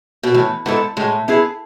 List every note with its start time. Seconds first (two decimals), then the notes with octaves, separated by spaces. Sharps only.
0.23 B2
0.34 A2 E3
0.66 G#2 B3 E4 A4
0.97 A2 G#3
1.28 B3 E4 G#4